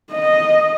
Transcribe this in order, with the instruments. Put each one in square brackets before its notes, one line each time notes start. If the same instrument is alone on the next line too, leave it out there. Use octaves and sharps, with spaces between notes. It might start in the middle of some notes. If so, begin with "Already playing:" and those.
[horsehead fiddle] D#5